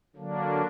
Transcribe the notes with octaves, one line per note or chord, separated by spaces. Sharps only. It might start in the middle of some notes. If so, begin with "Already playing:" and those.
D3 F#3 A#3 D4